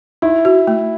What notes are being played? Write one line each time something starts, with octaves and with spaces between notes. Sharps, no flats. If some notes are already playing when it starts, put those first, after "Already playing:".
D#4 E4
F#4
A3